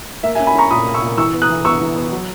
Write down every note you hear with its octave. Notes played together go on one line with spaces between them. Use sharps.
A#3 E5
E5 G#5
C#4
G#5 B5
C#4 A#5 C#6
A#2 B5 D#6
A#3
C#6 E6
A#2
E3 C#6 E6
B3
D#6 F#6
E3
B3 C#6 E6
E3
B3
F#3